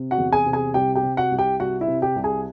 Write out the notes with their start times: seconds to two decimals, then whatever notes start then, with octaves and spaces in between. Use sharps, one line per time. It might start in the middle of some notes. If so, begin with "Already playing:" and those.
Already playing: C3
0.11 F#4 F#5
0.18 E2
0.32 G#4 G#5
0.46 C3
0.53 G#4 G#5
0.74 C2 G4 G5
0.95 G4 G5
1.03 C3
1.17 F#4 F#5
1.32 C2
1.38 G4 G5
1.60 C2 F#4 F#5
1.81 E4 E5
1.88 C3
2.02 G4 G5
2.16 C2
2.24 G#4 G#5